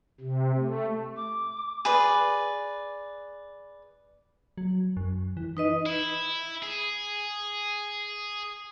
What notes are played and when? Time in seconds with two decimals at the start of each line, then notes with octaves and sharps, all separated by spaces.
0.20 C3
0.58 A3
1.16 D6
1.85 G#4 B4 D5
4.58 F#3
4.97 F#2
5.37 E3
5.57 D#4 B4 D#5
5.86 E4
6.63 G#4